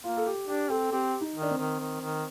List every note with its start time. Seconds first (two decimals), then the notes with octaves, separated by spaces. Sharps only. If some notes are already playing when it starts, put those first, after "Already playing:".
0.04 A#3 F4
0.17 A4
0.26 G4
0.47 D4 G4
0.69 C4 A4
0.92 C4 G4
1.21 D#4
1.35 D#3
1.42 D4
1.50 C4
1.58 D#3
1.79 D#3
2.01 D#3